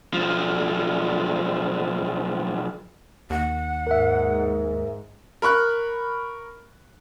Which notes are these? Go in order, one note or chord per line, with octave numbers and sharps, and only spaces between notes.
B1 F3
D#2 F#5
G#2 A#4 E5
A#4 B5 C#6 F#6